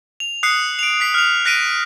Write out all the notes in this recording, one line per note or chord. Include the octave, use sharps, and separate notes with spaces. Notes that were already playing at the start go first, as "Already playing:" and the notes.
F7
D#6 F#6 C7 C#7
D7 F7
B6 C7
F6 F7
F#6 A#6 B6 D7 D#7